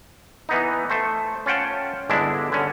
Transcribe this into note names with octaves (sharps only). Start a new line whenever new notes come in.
E3 B3 D#4
A3 C5
C#4 F4 F#5 G5 A5
G1 D3 G#3 D4 E4
D3 C#4